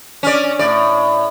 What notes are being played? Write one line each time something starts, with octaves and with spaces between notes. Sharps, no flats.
C#4 D5
A2 D5